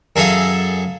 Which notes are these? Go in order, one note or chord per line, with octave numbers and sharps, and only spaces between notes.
F#2 G#4 A4 E5 F5 D#6